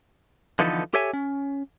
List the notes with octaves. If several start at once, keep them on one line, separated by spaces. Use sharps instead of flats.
D3 E3 F3 B3 D#4 A4
G4 A4 C#5 E5 G#5
C#4